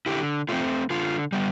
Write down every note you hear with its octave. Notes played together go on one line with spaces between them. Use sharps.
D3 E4 G4
A3 C4 F4
D3 F4
G3 B3